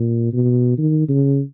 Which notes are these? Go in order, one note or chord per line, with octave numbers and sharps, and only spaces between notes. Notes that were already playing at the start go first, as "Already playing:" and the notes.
Already playing: A#2
B2
D#3
C#3